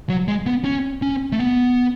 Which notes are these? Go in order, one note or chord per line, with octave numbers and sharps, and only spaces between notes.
F#3
G#3
B3
C#4
C#4
A3
B3